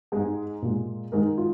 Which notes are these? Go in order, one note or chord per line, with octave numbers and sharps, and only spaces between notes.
G#2 G#3 G#4
A#2 G#3
G#2 D#3 G#3 A#4
F4